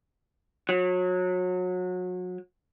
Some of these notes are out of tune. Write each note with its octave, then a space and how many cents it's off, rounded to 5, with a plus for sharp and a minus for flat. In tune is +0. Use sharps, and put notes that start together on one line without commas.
F#3 -30